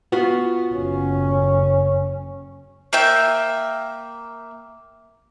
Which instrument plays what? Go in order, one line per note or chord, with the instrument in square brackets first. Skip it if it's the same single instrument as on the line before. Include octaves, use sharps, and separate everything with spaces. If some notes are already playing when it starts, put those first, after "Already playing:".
[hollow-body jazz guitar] B3 F4 F#4
[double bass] F#1 C#4
[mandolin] A#3 E5 G5